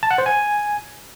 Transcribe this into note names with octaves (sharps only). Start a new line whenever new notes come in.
A5
F#5
C5
G#5